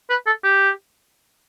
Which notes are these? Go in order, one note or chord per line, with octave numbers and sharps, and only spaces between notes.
B4
A4
G4